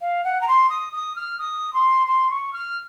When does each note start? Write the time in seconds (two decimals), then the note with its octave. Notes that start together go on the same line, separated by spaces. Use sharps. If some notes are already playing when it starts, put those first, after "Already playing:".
0.01 F5
0.24 F#5
0.41 A#5
0.48 C6
0.70 D#6
0.93 D#6
1.16 F6
1.39 D#6
1.73 C6
2.07 C6
2.30 C#6
2.53 F6